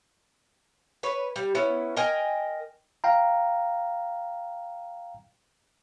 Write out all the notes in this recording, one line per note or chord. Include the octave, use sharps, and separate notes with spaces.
B4 C#5
G3
B3 C#4 E4
A#4 D#5 G5 G#5
F5 G5 A#5